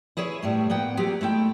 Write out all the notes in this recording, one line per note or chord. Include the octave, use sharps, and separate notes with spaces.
E4 G#4 B4 C#5 E5
A2 G3 A3
A#3 B3 F#5 G5
F#3 A#3 F4 G4 G#4
G#3 A3 E4 G5